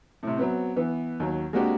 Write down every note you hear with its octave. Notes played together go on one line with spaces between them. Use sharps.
A2 C3
F#3 B3 C4
E3 B3
D#2 F#3
G#3 A#3 C4 D4 F#4 G4